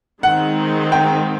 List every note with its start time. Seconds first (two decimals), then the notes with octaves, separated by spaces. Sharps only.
0.23 D#3 G#3 C4 D#4 F#5
0.92 G5